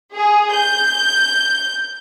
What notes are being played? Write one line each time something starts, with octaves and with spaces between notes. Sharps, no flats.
G#4
G6